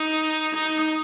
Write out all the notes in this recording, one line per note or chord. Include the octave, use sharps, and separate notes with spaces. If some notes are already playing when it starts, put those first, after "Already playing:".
Already playing: D#4
D#4